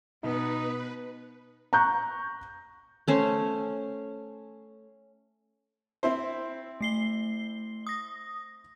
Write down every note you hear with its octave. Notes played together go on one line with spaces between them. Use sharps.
B2 B3 D#4 B4
A#5 C#6 F#6 G6
A3 C#4 C5
C4 E4 C5
A3 C7 G7
D#6 A#6